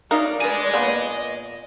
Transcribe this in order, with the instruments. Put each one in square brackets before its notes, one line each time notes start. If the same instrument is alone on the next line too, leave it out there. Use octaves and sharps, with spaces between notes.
[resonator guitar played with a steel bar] F#3 D#4 F5 [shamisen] A#4 [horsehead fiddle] D5
[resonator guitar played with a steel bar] D4 B4 [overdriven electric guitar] D#5 G#5
[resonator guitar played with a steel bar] A#2 [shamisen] A#3 B3